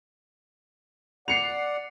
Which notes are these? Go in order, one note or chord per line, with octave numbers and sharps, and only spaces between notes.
D5 F#5 C7 C#7 F7